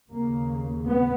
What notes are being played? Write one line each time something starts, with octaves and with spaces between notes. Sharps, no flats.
D#2 C#3 A#3
B3